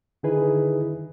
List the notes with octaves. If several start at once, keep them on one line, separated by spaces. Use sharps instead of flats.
D3 D#3 D#4 E4 G#4 B4